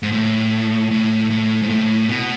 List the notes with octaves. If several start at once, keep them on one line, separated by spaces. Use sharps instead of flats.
G#2
A2
A2
A2
G#2
A2
B2